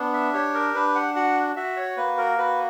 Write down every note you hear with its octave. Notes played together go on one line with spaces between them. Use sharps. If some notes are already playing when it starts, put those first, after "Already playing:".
Already playing: B3 D4
E5
G4 C#5
A#4
D4 B4
F#5
F#4 F#5
F#4 E5
C#5
A#3 B4
A#4
F#4 B4